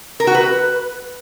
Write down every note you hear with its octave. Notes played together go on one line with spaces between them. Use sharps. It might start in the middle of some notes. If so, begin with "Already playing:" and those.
A#4
F#4
B4